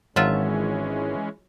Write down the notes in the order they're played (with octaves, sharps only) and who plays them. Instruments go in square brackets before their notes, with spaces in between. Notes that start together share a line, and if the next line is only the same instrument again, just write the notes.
[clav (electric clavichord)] G#1 E5 A5 [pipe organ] E3 G#3 C#4 [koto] F#3 F4